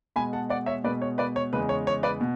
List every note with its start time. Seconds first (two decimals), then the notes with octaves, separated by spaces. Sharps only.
0.16 B2 G#3 G#5 B5
0.33 F#5 A5
0.49 D5 F#5
0.66 C#5 E5
0.84 B2 G#3 B4 D5
1.02 C#5
1.18 B4 D5
1.36 C#5
1.53 E2 C#3 G#3 B4
1.69 C#5
1.87 C#5
2.03 B4 D5
2.21 B2